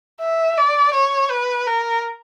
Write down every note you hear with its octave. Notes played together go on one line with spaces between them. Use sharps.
E5
D5
C#5
B4
A#4